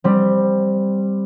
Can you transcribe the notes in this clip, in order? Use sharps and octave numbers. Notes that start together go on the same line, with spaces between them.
G3 C4